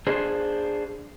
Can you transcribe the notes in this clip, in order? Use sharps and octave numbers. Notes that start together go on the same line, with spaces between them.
D4 G#4 C5